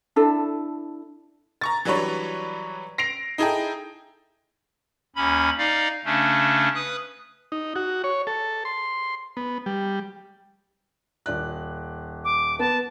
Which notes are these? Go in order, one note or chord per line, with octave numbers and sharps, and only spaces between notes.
D4 E4 A4
A#5 C#6 A6
E3 F#3 G3 D4 B4 C#5
A#6 C7 D7 F7
D#4 E4 G#4 A4 G5
D#2 C#4 B5
D#4 D5 F5
C#3 A3 C#4 D4
B4 D#6 F#6
D#4
F#4
C#5
A4
C6
B3
G3
D#1 D5 F#6
D6
B3 A5